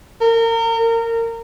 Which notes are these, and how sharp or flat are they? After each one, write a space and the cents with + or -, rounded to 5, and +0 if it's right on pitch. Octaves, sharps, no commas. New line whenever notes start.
A#4 -30
A#4 -25